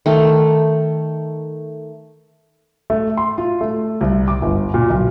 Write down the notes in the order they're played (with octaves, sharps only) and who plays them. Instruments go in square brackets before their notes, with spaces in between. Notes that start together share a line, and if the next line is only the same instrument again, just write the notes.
[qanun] D#3 A3
[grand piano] A3
C6
F4
A3
C2
D6
G1
A#2
B1